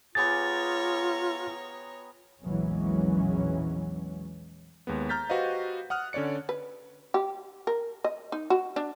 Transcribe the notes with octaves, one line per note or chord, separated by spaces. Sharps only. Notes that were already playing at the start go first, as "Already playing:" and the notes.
B3 F4 G4 G#4 C#5 A#5 A6
A#1 E2 E3 F#3 G#3 C#4
D#2 G#3 B3
A#5 F6 G6 A6 B6
F#4 G4 B4 C5 D#5 F5
F#5 D#6 F6 F#6
D3 C#4 C#5 D5 C#7
B4
G4
A#4
D#5
D#4
F#4
D4